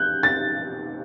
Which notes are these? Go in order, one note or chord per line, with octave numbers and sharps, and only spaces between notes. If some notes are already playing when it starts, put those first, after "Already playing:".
Already playing: F#6 G6
A6